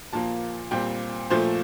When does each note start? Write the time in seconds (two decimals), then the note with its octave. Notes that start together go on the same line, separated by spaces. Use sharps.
0.13 A#2 F3 A#3 A5
0.71 A#2 G3 C4 G5
1.30 A#2 F3 A3 C5